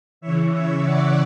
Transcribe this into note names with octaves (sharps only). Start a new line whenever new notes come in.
C#3 E3 C#5 E5
C#5 E5
D5 F#5